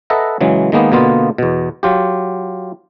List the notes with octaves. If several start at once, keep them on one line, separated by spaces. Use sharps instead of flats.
A4 B4 D#5 E5 F#5 A#5
C#3 E3 F#3 G#3
D#3 G#3 A#3 B3 D#4
B2 D3 A#3 B3 F4
E2 B2
F#3 F4 G4